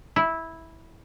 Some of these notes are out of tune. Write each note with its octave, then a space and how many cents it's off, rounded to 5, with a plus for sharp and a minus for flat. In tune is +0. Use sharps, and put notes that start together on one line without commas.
E4 -10